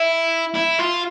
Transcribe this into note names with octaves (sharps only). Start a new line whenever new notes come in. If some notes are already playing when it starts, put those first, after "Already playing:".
Already playing: E4
E4
F4